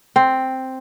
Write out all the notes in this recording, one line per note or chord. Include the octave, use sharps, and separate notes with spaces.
C4